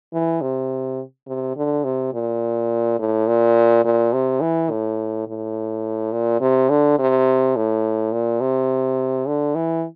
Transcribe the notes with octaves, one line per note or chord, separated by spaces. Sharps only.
E3
C3
C3
D3
C3
A#2
A2
A#2
A#2
C3
E3
A2
A2
A#2
C3
D3
C3
A2
A#2
C3
D3
E3